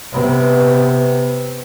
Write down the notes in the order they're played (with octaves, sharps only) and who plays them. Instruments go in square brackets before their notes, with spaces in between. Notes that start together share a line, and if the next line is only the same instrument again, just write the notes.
[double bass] C3 B3